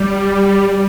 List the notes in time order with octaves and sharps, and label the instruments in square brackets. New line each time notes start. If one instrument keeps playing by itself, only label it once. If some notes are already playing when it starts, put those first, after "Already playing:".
Already playing: [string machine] G3